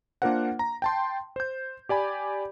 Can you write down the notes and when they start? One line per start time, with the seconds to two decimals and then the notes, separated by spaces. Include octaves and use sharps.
0.22 A#3 D4 F4 A#4 C5 F#5
0.59 A#5
0.82 G5 A5 C6
1.36 C5 G6
1.89 G4 D5 G#5 B5